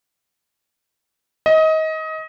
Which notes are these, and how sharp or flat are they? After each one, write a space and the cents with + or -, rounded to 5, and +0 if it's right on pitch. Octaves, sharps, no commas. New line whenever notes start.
D#5 +25